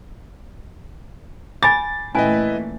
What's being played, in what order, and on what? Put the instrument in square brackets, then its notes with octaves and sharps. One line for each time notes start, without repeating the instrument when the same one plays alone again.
[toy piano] G#5 B5 D6 [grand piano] A6
[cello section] A#2 E3 A3 [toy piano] C#4 G#5 [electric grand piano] E4 B4 D#5